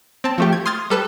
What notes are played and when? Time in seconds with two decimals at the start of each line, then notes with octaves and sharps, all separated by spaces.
0.24 C4 A5
0.38 F3 A3 G4
0.52 G#6
0.66 C6 D#6 F6 G#6 A6
0.90 G3 A4 B4 E7